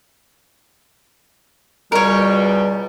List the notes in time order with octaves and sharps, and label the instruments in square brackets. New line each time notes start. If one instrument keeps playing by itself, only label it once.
[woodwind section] C#2 B2 G3 [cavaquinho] A#4 C#5